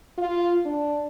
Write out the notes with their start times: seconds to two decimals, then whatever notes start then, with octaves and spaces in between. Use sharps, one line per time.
0.18 F4
0.66 D4